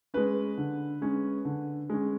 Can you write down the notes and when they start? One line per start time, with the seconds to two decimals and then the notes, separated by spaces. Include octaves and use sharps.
0.14 G#3 C#4 B4
0.58 D3
1.02 G#3 C#4
1.45 D3
1.90 G#3 C#4